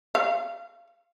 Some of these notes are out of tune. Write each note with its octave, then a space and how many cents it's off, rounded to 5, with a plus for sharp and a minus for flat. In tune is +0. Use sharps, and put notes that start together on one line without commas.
F5 -25